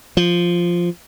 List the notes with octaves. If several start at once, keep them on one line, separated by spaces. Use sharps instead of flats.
F3